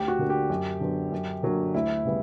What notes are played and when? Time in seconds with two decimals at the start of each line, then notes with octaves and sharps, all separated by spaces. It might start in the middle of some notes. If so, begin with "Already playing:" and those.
Already playing: D2 G4
0.08 F#4
0.19 D3 A#3
0.30 G4
0.50 F#2
0.80 D3 F#3 B3
1.12 F#2
1.43 D3 F#3 A#3
1.74 D2 E4
2.05 C#3 G3 B3